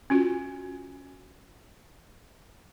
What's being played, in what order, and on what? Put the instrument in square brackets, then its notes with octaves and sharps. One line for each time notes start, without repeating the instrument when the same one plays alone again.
[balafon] C#4 F4 F#4